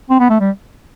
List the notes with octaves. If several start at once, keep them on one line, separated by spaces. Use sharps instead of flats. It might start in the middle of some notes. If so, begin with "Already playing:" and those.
C4
B3
A3
G3